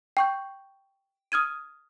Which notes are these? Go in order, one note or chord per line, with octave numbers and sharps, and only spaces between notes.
G5 C#6 G6
D#6 F6 G#6 D#7